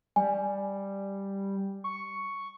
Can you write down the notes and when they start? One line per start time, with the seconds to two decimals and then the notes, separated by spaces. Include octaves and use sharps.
0.16 G3 G#5
1.84 C#6